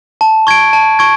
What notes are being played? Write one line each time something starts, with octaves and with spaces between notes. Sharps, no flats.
A5
C#6 G#6 D7
A5
C#6 G#6 D7